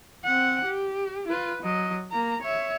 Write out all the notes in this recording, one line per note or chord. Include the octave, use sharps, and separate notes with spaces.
C4 F#5
G4
F4 B4
F#3 D#5
A#3 A#5
C#5 E5